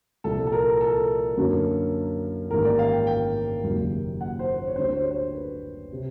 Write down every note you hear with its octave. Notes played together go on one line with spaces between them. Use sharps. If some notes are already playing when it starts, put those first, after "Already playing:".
C2 A#2 F3 A4
A4
A#4
A4
F#2 D3 F#3 A#3 C#4
A1 G#2 D#3 G3 A#3 A#4
D5
F5
G5
G5
F#1 F#2 D#3 G3 A#3
F#5
C5
C5
C#5
D2 D3 G3 C5
C#5
C5
C#5
C5
B4
C3